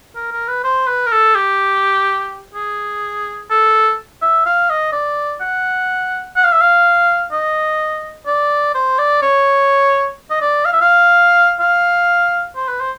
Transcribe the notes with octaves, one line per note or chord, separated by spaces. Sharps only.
A#4
A#4
B4
C5
B4
A#4
A4
G4
G#4
A4
E5
F5
D#5
D5
F#5
F#5
F5
E5
F5
D#5
D5
C5
D5
C#5
D#5
D5
F5
E5
F5
F5
C5
B4
C5